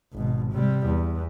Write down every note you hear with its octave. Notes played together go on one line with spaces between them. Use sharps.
G#1 B2
C3 G3
E2